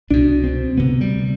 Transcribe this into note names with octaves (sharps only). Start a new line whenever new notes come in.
C2 B2 D4
C4
D2 C3 B3
G3